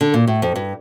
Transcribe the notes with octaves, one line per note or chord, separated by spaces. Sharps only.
D3
A#2
A2
F2
G2